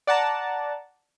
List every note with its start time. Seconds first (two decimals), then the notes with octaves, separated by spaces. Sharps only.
0.07 D5 F#5 A5 A#5